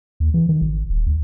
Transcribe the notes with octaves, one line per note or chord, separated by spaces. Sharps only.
D#2
E3
D#3
G#1
D#1
D2